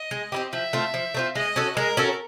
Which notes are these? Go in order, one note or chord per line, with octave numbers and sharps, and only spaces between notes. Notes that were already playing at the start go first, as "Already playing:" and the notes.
Already playing: D#5
G#3
C4 E4 G4
F3 E5
A3 C4 F4
F3
A3 C4 F4
G#3 D#5
C#4 F#4 A4
G#3 A#4
C#4 F#4 A4